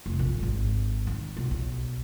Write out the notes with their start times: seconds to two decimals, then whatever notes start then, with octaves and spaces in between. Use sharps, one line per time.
0.06 F1
0.19 A#1
0.43 G#1
1.07 D#3
1.37 B1
1.51 B1